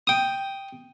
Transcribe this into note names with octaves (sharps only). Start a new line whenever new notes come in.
G5 D#6